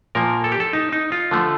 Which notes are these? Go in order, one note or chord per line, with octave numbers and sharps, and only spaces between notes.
A#2 F3 A#3 A#4
A4
G4
A4
D#4
D#4
F4
D3 F3 A3